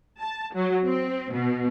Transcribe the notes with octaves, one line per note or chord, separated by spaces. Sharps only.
A5
F#3
C4
B2